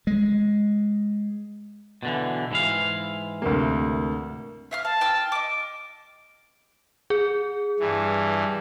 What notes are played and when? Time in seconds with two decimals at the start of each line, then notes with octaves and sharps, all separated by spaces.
0.07 G#3
2.03 B2 D3 E3
2.51 G#2 E3 F5
3.42 D2 C3 A#3
4.71 E5 F5 F6
4.85 F5 A5
5.01 G5 E6 F6
5.32 D#5 D6 D7
7.10 G#4
7.80 G2 E3